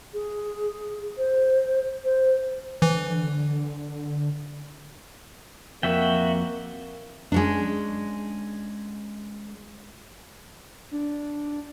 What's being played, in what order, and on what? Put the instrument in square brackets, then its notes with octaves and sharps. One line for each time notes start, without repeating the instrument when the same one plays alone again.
[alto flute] G#4
C5
C5
[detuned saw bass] D3 [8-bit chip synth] E3
[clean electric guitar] F2 [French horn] A#3 [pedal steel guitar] F#4 E5 G5
[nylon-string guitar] G#3 C#4 D4
[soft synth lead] D4